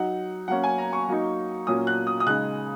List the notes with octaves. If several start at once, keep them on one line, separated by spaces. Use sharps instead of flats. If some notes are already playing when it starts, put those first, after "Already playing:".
Already playing: F#3 D#4 F#5
F#3 A#3 C#4 F#5
G#5
A#5
C#6
F#3 A#3 D#4
A#2 F#3 A#3 C#4 D#6
F#6
D#6
D#6
C#3 G#3 D#4 F#6